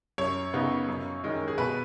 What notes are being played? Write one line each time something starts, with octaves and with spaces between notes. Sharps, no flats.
F#2 C#5
C#3 B3 D#4
F#2
D#3 G#3 C#4
G#4
B2 B4